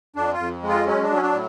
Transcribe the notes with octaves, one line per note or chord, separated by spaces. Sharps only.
F2 D4
F4
F2
G#3
F4
F#3 C#4
D4
F#3
C#4
D4
A2